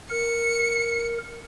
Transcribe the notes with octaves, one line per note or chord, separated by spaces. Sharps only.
A#4 C#7